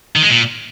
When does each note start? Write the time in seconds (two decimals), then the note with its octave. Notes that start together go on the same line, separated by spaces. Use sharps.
0.16 D#3
0.23 G#3
0.29 A#2